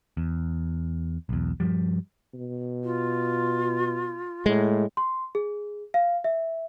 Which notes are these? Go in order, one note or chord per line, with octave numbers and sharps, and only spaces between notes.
E2
B1 E2
G2 F3 G3
B2
F4
A2 G#3
C6
G#4
F5
E5